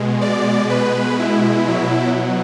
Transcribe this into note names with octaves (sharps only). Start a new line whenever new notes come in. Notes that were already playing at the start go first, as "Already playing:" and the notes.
Already playing: B2 G#3
D5
B4
E4
B2 F#3